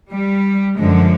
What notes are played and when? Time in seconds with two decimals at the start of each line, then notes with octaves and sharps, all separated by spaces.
0.12 G3
0.78 F#2 D3 F3 G#3